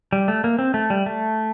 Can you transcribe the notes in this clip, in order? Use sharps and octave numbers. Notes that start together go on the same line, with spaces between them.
G3
A3
A#3
C4
A3
G3
A3